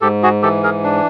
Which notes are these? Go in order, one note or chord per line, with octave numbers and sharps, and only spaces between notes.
G#2 G4 A4
F#4 G#4
E3 G4 A4
G#4 A#4
D4